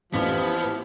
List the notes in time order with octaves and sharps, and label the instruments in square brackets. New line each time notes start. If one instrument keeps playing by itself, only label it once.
[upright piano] A1 E3 B6 [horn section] F3 [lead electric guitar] B3 [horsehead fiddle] E4 G4